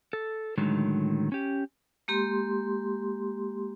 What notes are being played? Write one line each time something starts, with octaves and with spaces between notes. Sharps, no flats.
A4
A2 D3 D#3 F#3 G#3
C#4 G4
G#3 A#3 G4 C6